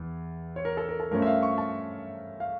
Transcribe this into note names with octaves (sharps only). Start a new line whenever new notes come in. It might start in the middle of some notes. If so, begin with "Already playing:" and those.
Already playing: E2
C#5
A#4
A4
A#4
A4
G2 F3 A3 C#4 A#4
E5
F5
C#6
A5
F5